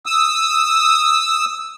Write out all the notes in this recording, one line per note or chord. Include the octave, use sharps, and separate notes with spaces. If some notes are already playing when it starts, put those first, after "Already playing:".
D#6 E6